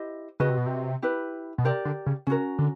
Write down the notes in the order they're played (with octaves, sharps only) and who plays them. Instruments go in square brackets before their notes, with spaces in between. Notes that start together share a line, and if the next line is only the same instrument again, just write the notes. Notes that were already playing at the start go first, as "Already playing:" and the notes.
Already playing: [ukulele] E4 G4 C5 D#5
[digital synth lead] C#3 [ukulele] F#4 B4 D#5
[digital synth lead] C3
B2
C3
[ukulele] E4 G4 B4
[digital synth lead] B2
[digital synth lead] C3 [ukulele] G4 A#4 D5
[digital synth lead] D3
C#3
[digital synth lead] C#3 [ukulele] C#4 F#4 A#4
[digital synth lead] D3